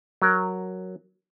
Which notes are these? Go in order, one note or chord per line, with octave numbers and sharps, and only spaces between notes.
F#3 A#4